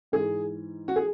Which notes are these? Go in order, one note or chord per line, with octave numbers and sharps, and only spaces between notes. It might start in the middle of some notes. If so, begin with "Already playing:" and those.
G#2 E3 G#4
F#4
G#4